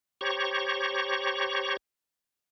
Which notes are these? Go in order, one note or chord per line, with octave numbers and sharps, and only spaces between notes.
G4 C5 C#5 A#5 C#6